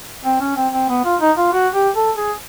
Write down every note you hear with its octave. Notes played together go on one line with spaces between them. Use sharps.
C4
C#4
C4
C4
B3
F4
D#4
F4
F#4
G4
A4
G#4